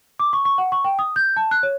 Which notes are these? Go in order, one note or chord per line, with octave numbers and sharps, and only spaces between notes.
D6
C#6
C#6
F#5
C#6
G5
D#6
G6
A5
F#6
C#5